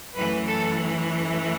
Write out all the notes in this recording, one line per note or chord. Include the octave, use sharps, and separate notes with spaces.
F#2 E3 A3 B4
A4